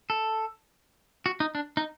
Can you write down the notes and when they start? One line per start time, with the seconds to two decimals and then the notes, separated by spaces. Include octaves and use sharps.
0.10 A4
1.26 F#4
1.40 D#4
1.55 D4
1.77 D#4